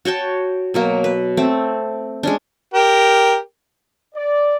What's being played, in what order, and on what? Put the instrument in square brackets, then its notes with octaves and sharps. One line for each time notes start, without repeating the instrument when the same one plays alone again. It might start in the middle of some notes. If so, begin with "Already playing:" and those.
[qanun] F#4 C#5 G5 A5
B2 F#3 A#3
B4
A3 C4
G#3 C#4 D4
[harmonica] G4 A#4
[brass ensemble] D5